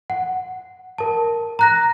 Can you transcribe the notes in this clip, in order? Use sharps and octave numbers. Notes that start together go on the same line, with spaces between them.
F#5
A#4 A5
A#5 F#6 A#6